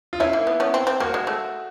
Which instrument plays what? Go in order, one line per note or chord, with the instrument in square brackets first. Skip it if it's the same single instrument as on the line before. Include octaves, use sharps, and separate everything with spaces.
[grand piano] F4
[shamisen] C#4 D#4 [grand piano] E4
[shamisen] A#3
B3
B3 C#4
C4
C4
[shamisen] A#3 [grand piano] F#4
[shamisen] G#3
A3